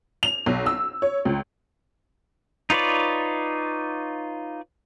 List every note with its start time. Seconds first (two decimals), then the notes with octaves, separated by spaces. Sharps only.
0.23 F7
0.46 B1
0.66 E6
1.02 C#5
1.25 C#2
2.70 D#4 F4 B4 C#5 D5